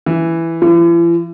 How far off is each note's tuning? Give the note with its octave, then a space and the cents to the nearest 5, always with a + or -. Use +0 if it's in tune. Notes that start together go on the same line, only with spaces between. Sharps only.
E3 +5
E3 +45